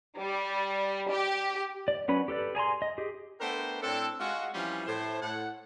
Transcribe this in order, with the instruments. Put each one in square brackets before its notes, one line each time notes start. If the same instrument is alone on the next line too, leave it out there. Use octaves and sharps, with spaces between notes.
[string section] G3
G4
[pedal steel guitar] D5
F#3 C#4 B4 B5
G4 A4 B4 D5
G#4 G#5 A#5 C6
D#5
G4 G#4
[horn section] A3 B3 D4 A#4 C5 G5
A2 C4 D4 A4
G#3 F4 F#4
E3 F3 G3 C4 C#4 F4
A2 C5
A2 F#5